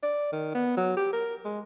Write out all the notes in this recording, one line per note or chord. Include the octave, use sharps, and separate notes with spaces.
D5
D#3
B3
F#3
G4
A#4
G#3